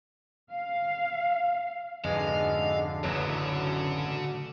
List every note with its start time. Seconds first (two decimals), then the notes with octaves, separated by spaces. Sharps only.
0.52 F5
2.04 F2 G#2 B2 D3 G#3 B3 F5
3.04 D1 A1 F#2 C#3 F#3 B3 F4